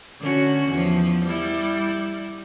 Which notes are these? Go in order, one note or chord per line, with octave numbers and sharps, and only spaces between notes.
D3 C#4 F#4
E2 F3
G3 E4